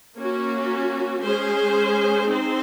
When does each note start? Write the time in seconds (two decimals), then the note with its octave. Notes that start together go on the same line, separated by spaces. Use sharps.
0.16 A#3 C#4 F#4
1.22 G#3 C#4 G#4 C5
2.27 C4 D#4 G#4 C5